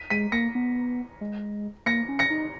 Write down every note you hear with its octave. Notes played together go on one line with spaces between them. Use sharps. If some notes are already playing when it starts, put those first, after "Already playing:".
Already playing: B6 D#7
G#3 B6 D#7
A#3 A#6 C#7
B3
G#3
A#3 A#6 C#7
C#4
A#6 C#7
D#4